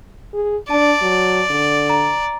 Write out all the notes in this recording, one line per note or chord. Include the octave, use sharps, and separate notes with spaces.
G#4
D4 D5 A5
F#3
D3
A#5